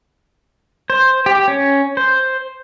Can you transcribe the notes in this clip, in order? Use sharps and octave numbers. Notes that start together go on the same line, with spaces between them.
C5
G4
C#4
C5